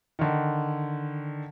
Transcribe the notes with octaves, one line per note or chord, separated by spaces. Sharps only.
D3 D#3